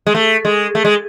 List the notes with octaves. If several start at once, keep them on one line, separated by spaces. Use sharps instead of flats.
G#3
A3
G#3
A3
G#3